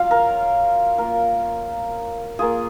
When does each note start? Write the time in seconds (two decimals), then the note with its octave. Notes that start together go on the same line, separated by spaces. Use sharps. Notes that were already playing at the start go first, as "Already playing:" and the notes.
Already playing: F#3 C#4 F4 F5
0.11 A#4
0.98 A#3 F4 A#4
2.39 A#3 F4 G#4